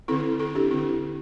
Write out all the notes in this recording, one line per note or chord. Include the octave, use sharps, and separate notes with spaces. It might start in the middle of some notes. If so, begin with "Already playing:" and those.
D3 C4 E4 A4
E4 A4
D4 G4
D3 C4 E4